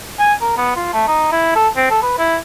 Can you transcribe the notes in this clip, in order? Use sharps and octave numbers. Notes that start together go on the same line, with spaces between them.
G#5
A#4
B3
F4
A3
D#4
E4
A4
C4
A4
B4
E4